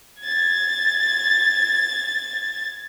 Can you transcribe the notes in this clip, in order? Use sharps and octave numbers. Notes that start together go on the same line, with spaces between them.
G#6 A6